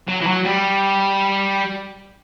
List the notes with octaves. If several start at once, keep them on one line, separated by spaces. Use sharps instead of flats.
F#3
E3
F#3
G3